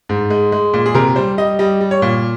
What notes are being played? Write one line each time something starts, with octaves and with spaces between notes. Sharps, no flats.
G#2
G#3
G#3
A#2
G#4
C3 A#4
G3 C5
G3 D#5
G3 D#5
G3
C#5
A#2